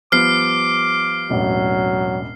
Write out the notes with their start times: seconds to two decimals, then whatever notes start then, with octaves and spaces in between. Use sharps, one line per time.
0.12 F3 G3 B3 D6 F6 C7
1.30 E1 A1 F#3